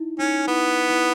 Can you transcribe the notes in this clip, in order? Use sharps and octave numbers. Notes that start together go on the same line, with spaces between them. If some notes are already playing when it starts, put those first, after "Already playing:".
Already playing: D#4 E4
C#4 D#4
B3 E4
E4